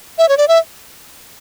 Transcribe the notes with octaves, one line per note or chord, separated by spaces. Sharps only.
E5
C#5
D5
E5